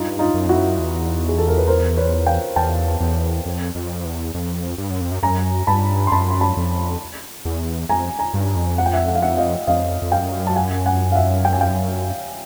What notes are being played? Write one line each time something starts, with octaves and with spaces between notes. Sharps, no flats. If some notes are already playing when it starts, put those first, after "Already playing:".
Already playing: G2 D#4 F4
D#4 F4
F#2
F2 E4 F#4
F#2
E2
G#4
A4
A#4
B4
A#4 C5
B4 C#5
F5 G5
E2 G5 A5
E2
F2
F2
E2
F2
G2
F#2
F2
F#2
F#2 G#5 A#5
G2 A5 B5
C6
F#2 A5 B5
C6
A5 B5
F2
E2
F2 G#5 A#5
G#5 A#5
G2
F2
F#5
G5
E5 F#5
F#5
F5
E5 F#5
D#5 F5
F2 D#5 F5
F2
F#2 F5 G5
A5
F#5 G#5
F#5 G#5
F5
E5 F#5
G5
G#5
F5 G5